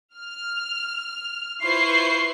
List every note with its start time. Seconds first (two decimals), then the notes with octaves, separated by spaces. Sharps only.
0.15 F6
1.62 E4 F4 B4 C5 C#6 C7